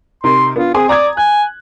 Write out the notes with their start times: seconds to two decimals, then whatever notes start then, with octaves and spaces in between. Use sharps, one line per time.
0.24 C3 D#4 A#4 C6
0.56 B3 D4 F4
0.74 C4 G#4 G#5 C6
0.89 D5 A#5 D#6 G#6
1.17 G#5 F#6